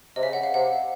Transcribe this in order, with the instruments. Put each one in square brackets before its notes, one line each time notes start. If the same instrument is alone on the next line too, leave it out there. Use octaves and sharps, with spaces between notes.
[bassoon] C3 [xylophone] D#5
[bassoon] C#3 [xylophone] E5
[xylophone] F#5
F5
[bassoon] C3 [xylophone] F#5